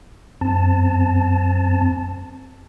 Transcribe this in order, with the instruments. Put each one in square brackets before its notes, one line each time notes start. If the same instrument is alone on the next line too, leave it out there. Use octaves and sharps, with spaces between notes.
[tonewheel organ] F#2 C4 A5